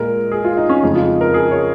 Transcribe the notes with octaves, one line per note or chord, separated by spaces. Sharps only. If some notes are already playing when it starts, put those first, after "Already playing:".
Already playing: A#2 G#3 A#4
G#4
F4
D#4
C#4
F2 C#3 G#3 D#4
F4
A#4
G#4
C#5